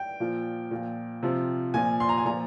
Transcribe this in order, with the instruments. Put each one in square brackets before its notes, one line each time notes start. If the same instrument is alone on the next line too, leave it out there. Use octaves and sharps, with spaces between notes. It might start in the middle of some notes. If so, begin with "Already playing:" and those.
Already playing: [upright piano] G5
A#2 F3
A#2 F3
C3 F3
A#2 F3 G#5
C6
A#5
G#5
A#2 F3 A#5